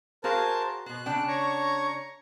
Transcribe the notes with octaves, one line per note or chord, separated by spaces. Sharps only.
F#4 G#4 A#4 C5 F5 A5
B2 C5 F#6
C#3 D4 G5
C#5 A#5 C#6